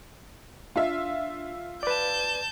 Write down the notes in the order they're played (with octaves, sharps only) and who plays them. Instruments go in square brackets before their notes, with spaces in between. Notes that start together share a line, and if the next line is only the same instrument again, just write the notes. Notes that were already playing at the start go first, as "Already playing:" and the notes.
[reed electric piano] D4 [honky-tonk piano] F4 E5
[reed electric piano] B4 D5 [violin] A5 G6